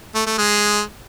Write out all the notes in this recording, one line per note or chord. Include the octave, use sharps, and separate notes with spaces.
A3
A3
G#3